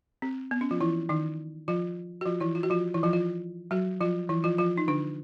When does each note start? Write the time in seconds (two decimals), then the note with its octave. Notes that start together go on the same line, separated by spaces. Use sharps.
0.22 C4
0.51 B3
0.61 C#4
0.71 F3 F4
0.80 E3 E4
1.09 D#3 D#4
1.68 F3 F4
2.21 F#4
2.26 F3 F4
2.40 E3 E4
2.55 F4
2.63 F#4
2.70 F3 F4
2.94 E3 E4
3.03 F3 F4
3.13 F3 F4
3.71 F#3 F#4
4.01 F3 F4
4.29 E3 E4
4.44 F3 F4
4.58 F3 F4
4.78 D#4
4.88 D3 D4